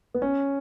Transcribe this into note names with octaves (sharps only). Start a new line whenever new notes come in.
B3
C#4